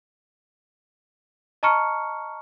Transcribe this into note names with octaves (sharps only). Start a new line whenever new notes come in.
D#5 A5 A#5 C#6 F6 C#7